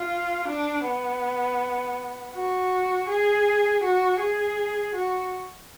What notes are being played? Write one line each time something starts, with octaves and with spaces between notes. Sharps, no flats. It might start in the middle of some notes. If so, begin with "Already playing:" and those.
Already playing: F4
D4
B3
F#4
G#4
F#4
G#4
F#4